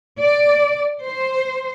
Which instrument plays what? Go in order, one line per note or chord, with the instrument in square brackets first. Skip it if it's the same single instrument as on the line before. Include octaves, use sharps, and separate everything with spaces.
[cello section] D5
C5